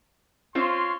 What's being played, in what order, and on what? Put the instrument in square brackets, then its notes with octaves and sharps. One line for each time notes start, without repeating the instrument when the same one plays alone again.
[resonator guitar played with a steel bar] C4 F4 C5 [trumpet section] C#5 F5 C6